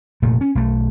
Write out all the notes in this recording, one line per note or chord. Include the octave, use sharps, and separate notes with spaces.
F1 A#2 A3
C#4
B1 A3